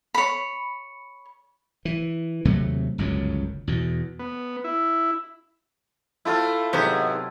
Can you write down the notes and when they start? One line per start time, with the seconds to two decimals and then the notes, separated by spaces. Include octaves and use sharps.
0.15 C#5 B5
1.85 E3
2.45 D#2 C3 F#3 A3
2.98 G1 C#2 F#2 F#3
3.67 E2 B2
4.19 B3
4.64 E4
6.25 A3 C4 E4 F4 A4 F5
6.73 G#2 C3 F#3 B3 G4 G#4 C5